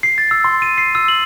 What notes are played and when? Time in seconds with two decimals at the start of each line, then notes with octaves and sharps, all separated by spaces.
0.03 C7
0.18 A6
0.31 E6
0.44 C6
0.62 D#7
0.78 C7
0.95 E6
1.08 F#7